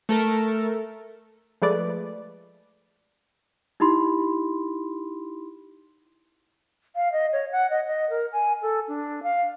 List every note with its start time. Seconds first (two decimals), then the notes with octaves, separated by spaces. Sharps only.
0.09 A3 A4 A#4
1.62 F3 G#3 A3 B4 D5
3.80 D#4 E4 G4 B5 C6
6.96 F5
7.12 D#5
7.33 C#5
7.52 F#5
7.70 D#5
7.87 D#5
8.10 A#4
8.33 G#5
8.62 A4
8.88 D4
9.23 F5